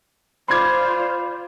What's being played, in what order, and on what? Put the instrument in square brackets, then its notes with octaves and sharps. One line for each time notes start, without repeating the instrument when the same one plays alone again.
[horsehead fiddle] F4 D5 [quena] C5 [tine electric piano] B5 D6 [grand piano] C6 G#6